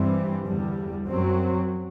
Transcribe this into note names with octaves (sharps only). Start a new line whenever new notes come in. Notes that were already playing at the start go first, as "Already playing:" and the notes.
Already playing: G2 E3 G3 C4
E2 D3 G3
F#2 F#3 C4